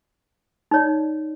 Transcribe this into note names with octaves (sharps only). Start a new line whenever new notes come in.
D#4 C#5 D5